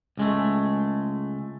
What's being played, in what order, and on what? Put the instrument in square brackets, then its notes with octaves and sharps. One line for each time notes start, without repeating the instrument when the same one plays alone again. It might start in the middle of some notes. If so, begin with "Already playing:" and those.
[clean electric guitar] C#2 G#3 A3